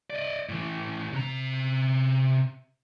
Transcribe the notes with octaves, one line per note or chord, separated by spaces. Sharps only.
D5 D#5
A2 E3
C3 A#5